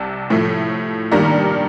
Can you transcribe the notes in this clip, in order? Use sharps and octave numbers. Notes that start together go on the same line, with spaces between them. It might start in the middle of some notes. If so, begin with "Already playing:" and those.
Already playing: C2 C3 A5
A2 F3 A3
G2 D#3 G3 A#3 A#5